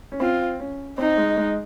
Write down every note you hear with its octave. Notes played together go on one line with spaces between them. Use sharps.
C#4
C4 F4
C#4
C4 D#4
G#3
G#3